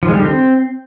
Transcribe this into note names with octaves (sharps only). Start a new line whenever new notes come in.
F3
G#3
G3
D3
C4